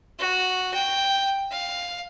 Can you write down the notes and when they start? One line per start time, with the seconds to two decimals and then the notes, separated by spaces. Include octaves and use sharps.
0.19 F#4
0.74 G5
1.51 F5